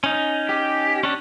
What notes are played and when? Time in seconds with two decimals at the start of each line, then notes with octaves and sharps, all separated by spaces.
0.04 C#4 D#4
0.49 G4
1.03 C#4 D4